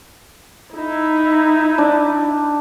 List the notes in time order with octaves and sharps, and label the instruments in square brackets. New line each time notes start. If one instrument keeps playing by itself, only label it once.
[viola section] D#4 E4
[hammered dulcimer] D4